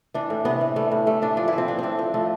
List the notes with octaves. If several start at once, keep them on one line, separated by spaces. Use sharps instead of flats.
E3 D4
A2
C3 B3
E3
G3 A3
A2
G3 A3
E3 D4
F3 D4
E4
F3
C4
F3 D4
A2 C4 D4
F3 C4
F3 A3